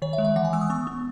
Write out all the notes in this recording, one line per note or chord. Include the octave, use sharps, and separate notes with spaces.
D#3 C#5
E5
G#3
E5
E3 F#5
G#5
G#3 E6
D#6
B3 C#6
B3